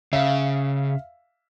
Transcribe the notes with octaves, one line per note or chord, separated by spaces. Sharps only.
C#3 E5 F5